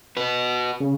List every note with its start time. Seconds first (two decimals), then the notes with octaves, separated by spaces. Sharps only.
0.17 F#4 B4
0.80 C#3